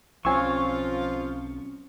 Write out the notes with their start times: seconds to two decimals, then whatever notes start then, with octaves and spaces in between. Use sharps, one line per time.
0.25 B1 F3 C4 C#4 F4 G#5 C#6 E6